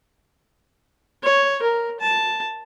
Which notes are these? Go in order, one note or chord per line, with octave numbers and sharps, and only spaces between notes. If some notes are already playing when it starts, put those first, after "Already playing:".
C#5
A#4
A5